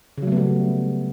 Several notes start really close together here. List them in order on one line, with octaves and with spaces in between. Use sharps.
C#3 F#3 A3 B3 G3